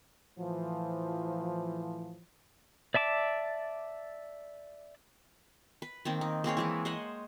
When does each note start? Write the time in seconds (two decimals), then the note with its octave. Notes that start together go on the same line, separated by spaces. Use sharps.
0.38 A2 E3 F3
2.94 D5 E5 A5 D6
5.82 B4
6.05 D#3 A#3 C4
6.21 D#4
6.44 A#3 C4 G#4 C#5
6.57 E3 G#3 E4
6.85 C5 C#5 D#5 F#5